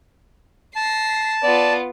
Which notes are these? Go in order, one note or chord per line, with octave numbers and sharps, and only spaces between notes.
A5 A#6 C7
B3 F4 D5